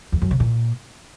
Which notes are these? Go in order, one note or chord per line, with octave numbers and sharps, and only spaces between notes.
E2
F#2
C#3
A#2